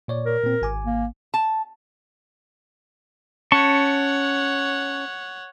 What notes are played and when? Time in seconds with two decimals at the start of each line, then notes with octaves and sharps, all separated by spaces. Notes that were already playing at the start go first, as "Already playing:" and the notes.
0.08 A#2 C#5 D5
0.26 A#4
0.43 A#2 C4
0.62 G#1 G#5 D6
0.86 A#3
1.34 A5
3.52 C#4 C#5 F#5 A5 C#6